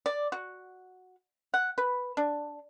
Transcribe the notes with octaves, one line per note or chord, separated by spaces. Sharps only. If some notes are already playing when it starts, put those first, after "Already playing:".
D5
F#4
F#5
B4
D4